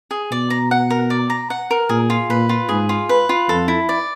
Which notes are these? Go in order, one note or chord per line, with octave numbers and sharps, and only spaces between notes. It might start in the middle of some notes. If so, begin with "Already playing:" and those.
G#4
B2 D5
A#5
F#5
A#4
D5
A#5
F#5
A#4
A#2 G#4
F4
A#2 B4
F4
G#2 G#4
F4
B4
F4
F2 A4
E4
D5